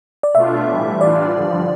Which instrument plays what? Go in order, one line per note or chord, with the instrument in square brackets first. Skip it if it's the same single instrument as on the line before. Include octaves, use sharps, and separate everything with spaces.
[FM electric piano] D5
[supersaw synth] B2 A3 D4 F4 [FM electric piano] E5
[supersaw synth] A2 E3 G3
[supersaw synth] E3 G3 D4 F4 [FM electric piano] D5
[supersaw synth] G2 D3 F3